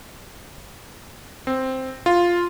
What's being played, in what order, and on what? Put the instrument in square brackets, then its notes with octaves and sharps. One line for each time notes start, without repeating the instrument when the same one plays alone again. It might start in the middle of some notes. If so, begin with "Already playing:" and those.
[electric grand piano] C4
F4